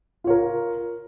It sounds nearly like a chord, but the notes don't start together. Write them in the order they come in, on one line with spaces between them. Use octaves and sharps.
F4 C#5 A#4